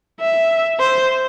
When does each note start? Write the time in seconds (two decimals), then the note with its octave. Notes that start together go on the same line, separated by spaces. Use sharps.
0.20 E5
0.80 C5